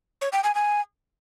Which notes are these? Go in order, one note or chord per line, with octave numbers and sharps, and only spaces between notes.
C#5
G5
G#5
G#5